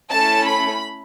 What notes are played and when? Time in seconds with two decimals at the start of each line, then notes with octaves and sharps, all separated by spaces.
0.12 A3 C#4 E4 A4 A5
0.47 B5